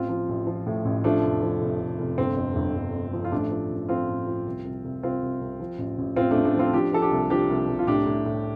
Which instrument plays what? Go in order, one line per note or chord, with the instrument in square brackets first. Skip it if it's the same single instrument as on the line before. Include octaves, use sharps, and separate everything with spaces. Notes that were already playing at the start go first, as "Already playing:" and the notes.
Already playing: [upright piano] A1 C4 F4
F3
A1
F3
A2
A1
F3 A3 D4
F1
F3
F1
F1
F1
G1 C4
F2
G1
G1
F2
F3
F4
A1 A3 D4
F3
A1
F3 C4 F4
A1
F3
C2
C2
C2
C2 C4 F4
C2
C2
F3
A1
A1
A1 C4 F4
A3 D4
A1
A3 D4
F3 C4 F4
F3 D4 G4
F3 A4
D4 G4
C2
F3 D4 G4
C2
C2
F4
A2 D4 G4
A2
A2